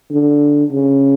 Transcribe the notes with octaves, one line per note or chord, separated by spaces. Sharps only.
D3
C#3